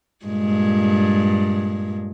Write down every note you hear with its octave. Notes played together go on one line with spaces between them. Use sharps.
G2 A#2 G#3